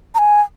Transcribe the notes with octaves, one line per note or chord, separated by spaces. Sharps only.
A#5
G#5